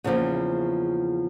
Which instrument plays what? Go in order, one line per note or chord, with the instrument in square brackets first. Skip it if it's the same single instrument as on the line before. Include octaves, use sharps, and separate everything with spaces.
[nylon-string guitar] E2 C#3 F3 A#3